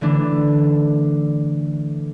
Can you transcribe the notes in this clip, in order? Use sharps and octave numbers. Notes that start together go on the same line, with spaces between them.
D3 E3 A3 D4